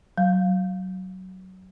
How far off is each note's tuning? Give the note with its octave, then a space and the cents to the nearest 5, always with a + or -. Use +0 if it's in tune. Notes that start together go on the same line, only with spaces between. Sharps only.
F#3 +15